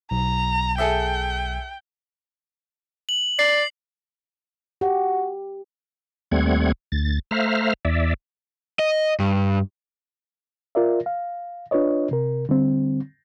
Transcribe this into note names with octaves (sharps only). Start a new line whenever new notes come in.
B1 A#5
G#4 A4 E5 G5
F#7
D5 C7
F#4 G4
D#2 G3 A3 C4 F#5 G#6
D2 A6
A3 C5 E5 F5 A#5 F6
E2 D5 E5
D#5
G2
F4 A#4 D5 E5
F5
D4 F4 B4 C#5 D#5
C3 A#4
D3 G3 C4